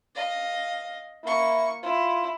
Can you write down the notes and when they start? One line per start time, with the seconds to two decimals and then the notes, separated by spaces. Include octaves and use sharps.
0.15 D#5 F5
1.24 A#3 E4 C#6
1.83 E4 F4